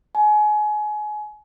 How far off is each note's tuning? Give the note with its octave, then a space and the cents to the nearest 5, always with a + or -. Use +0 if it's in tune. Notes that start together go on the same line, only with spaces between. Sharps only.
G#5 +25